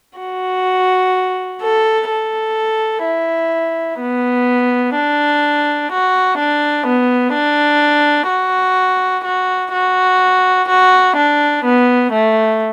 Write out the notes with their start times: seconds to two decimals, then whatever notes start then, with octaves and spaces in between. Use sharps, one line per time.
0.19 F#4
1.62 A4
2.09 A4
3.05 E4
4.00 B3
4.95 D4
5.91 F#4
6.39 D4
6.87 B3
7.34 D4
8.30 F#4
9.25 F#4
9.73 F#4
10.68 F#4
11.16 D4
11.64 B3
12.12 A3